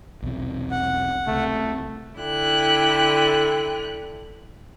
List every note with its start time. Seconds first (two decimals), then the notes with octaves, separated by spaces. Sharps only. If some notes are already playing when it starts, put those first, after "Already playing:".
0.22 B1 E2 C3
0.71 F#5
1.27 C#2 C3 A3
2.20 D3 E4 G5 F#6